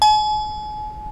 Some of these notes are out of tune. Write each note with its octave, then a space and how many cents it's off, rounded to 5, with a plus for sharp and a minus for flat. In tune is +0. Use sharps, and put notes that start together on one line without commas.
G#5 +40